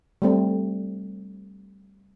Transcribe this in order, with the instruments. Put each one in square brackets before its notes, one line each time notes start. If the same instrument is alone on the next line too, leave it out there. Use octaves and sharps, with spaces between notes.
[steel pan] G3 A3 C4